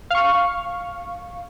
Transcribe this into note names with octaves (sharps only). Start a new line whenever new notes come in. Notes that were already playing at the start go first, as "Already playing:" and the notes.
F5 C#6